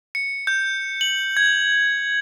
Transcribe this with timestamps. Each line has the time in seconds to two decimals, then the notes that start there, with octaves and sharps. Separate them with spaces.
0.15 C#7
0.47 G6
1.01 F#7
1.37 G#6